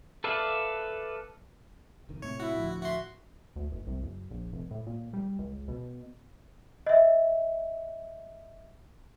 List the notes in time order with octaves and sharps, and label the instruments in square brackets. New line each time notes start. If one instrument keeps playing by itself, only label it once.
[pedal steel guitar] A4 B4 D5 E5 F5
[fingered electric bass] F1 D#3
[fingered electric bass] A2 C3 A3 [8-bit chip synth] C#5
[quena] E4 [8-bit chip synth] F#4
[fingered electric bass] D2 A2 F3
[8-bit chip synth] F#4 C6 [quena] E5
[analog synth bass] D2
F#1
C2
F#1
A#1
F1
A2
A#2
G3
C#2
B2
[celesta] D#5 E5